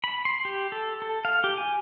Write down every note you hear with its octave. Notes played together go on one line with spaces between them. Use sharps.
B5
C6
G4
A4
A4
F5
G4
G#5